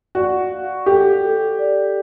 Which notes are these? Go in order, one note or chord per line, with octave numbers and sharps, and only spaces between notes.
F#4 D5
F5
G4 A4
A4
D5